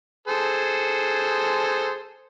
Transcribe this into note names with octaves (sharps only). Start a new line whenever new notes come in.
G#4 A4 C5